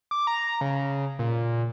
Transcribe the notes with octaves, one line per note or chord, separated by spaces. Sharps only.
D6
A#5
C#3
A#2